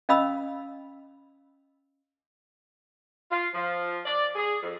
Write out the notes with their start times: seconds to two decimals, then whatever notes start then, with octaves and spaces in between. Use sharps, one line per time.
0.09 C#4 D#5 F5 B5 D#6 E6
3.30 F4
3.54 F3
4.06 D5
4.35 G#4
4.63 F2